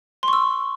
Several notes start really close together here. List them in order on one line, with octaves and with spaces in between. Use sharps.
C6 C#6 E6